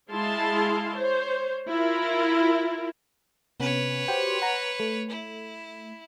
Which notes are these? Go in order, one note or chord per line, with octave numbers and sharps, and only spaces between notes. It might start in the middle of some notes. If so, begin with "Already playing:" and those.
G#3 E4 G#4 F5 A5 C6
C5 C#5
E4 F4 A#4
C3 B3 C#4 B4 C#5
F#4 G4 C5
F#5 A#5
A3
E4